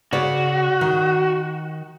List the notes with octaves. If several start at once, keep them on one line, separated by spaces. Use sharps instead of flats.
C#3 F#4 C#5 D5
D#3